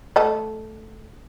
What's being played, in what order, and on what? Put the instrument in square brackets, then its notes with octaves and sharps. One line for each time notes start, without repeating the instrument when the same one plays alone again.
[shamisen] A3 A4 D#5